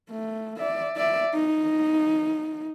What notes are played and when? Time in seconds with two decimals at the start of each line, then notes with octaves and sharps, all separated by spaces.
0.10 A3
0.57 D5 E5
0.97 D5 E5
1.34 D#4